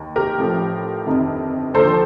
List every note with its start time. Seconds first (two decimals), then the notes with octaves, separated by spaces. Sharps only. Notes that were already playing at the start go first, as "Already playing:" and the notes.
Already playing: D#2 D#3
0.16 G4 A#4
0.38 A1 A2 F3
1.06 G1 F2 D#3
1.74 D#2 D3 F3 A4 C5